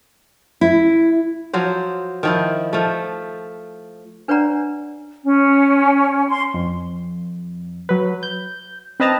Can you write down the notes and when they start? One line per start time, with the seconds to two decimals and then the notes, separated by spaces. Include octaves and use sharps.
0.61 E4
1.53 F3 F#3 C5
2.23 D#3 F3 E4
2.73 F3 A3
4.28 D4 B4 C#5 D5 F#5 A#5
5.25 C#4
6.28 C6
6.54 F2
7.89 F#3 B4
8.23 G6
9.00 C4 B4 D#5 A5 A#5